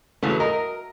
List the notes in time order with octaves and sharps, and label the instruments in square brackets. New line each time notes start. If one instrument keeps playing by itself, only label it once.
[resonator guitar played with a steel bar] C#3 E3 F#3 [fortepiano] A3
[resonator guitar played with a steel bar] A#4 [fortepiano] D#5